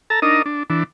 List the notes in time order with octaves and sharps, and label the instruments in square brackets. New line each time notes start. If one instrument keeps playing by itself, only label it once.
[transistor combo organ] A4 A5 A#5
D4 D#4 A#4 D#5
D4
E3 D4